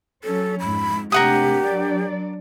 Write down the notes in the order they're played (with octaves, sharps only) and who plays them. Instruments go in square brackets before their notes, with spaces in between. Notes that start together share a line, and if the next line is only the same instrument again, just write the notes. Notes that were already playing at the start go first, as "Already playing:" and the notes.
[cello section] F#3 C#4 [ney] A4
[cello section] F2 G#2 [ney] B5
[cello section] C3 A3 D4 [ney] G4 [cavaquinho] A#4 F#5 D#6
[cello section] F#3 D4 D5